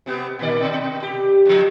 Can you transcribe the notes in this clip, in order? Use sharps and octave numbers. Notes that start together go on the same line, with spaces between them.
C3 B3 G4
A#2 D#3 D5
B2
G4
G2 F3